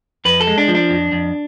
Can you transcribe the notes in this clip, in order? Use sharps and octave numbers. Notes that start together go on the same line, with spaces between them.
F2 B4
A4
G#3
D4
F3
D4
F2
F2